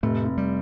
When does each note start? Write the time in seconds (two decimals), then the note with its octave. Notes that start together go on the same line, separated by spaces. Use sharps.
0.03 F1 A2 A3
0.25 F1
0.37 G3